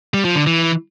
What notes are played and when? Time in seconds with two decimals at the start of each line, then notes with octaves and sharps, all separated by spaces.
0.14 G3
0.25 F3
0.36 D3
0.47 E3